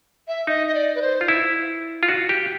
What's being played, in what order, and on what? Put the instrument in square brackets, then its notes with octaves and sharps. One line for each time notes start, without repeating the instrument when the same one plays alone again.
[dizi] E5
[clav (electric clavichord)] D#4 [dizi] D#5
[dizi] D#5
D5
B4
C5
[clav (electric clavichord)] F4
E4
F4
F#4
G4